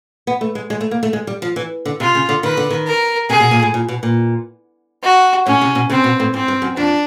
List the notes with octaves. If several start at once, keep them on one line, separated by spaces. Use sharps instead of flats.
B3
A3
G#3
G#3
A3
A#3
A3
G#3
G3
F3
E3
D3
C3 F4
C#3
D3
D#3 B4
D3
D#3
A#4
C3 G#4
B2
A#2
A2
A#2
B2
A#2
F#4
A2 C#4
C3
B2
C#3 C4
B2
A2
G#2 C4
G2
F#2
F2 D4